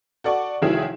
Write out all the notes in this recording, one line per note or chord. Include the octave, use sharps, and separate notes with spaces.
F#4 A4 D5 C#6
F1 D#3 F#3 E4 G#4 E7